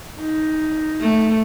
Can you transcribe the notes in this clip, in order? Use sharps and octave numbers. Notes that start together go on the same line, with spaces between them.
D#4
A3